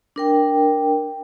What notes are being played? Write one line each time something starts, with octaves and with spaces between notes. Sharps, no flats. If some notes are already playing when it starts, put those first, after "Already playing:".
D4 A#4 G5